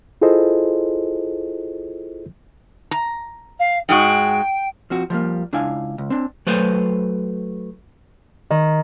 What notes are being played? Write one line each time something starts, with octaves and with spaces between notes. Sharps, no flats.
E4 F4 G#4 A4 C5 D#5
A#5
F5
G#2 G#3 F#4 G5
F3 C4 F#4
F3 G3 G#3 A#3
C#2 D4 E4 F5 G#5
C#2
C4 D4
F#3 A3 B4 C5
D#3